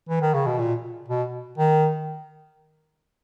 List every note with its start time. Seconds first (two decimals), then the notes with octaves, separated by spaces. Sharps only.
0.09 E3
0.21 D#3
0.34 C#3
0.46 B2
0.59 A#2
1.08 B2
1.58 D#3